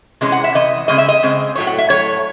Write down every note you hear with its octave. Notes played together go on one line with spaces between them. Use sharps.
C3 E3 G#3 C#4
F#5
E5
C3 E3 D#5
C#3 G#3 C4 D#5
E5
D#5
C#3 G#3 C4
A2 F#3 A3 C#5
F#5
E5
A2 F#3 A3 C#5